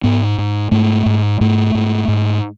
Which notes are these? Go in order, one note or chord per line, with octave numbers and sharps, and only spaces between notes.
G#2 B3
G#2
G#2 A3
G#2
G#2 A3
G#2
G#2